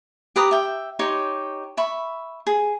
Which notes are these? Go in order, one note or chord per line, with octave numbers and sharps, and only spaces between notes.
G4 B4 A#5 D#6
E5 G5
D#4 G4 C#5 C6
E5 B5 C#6
G#4